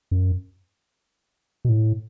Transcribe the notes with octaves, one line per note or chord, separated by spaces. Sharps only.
F#2
B2
A2